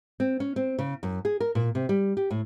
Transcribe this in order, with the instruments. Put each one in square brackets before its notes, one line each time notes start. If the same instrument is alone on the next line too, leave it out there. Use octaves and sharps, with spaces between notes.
[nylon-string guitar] C4
C#4
C4
C#3
F#2
G#4
A#4
A#2
C3
G3
G4
A2